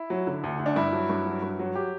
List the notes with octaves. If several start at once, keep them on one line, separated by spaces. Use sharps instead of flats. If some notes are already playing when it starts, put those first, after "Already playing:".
Already playing: E4
F#3
D3
D2
D2
D4
G2 E4
F#3
G2
F#3
G2
F#3
G4